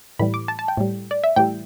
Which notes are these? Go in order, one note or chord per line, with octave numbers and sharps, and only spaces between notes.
A2 E3 G3 B5
D6
A5
A5
G5
A2 G3
D5
E5
A2 E3 G3 G5